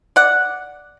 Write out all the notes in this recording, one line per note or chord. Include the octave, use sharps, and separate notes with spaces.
D5 F#5